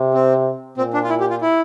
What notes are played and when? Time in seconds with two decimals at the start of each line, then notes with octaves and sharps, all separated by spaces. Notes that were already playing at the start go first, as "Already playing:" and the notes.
Already playing: C3
0.14 C4
0.78 A#2 C4
0.94 D4
1.04 F4
1.09 E4
1.20 G4
1.30 F4
1.41 E4